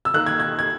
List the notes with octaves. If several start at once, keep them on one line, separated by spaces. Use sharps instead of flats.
E6
D#3 A#3 D#4 F#6
G#6
G#6
G#6